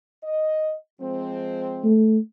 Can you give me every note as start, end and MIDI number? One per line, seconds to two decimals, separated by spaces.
0.23 0.74 75
1.01 1.88 53
1.01 1.88 56
1.01 1.88 60
1.84 2.18 57